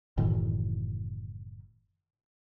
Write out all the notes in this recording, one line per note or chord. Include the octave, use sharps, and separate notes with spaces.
F#1 A2 D#3 E3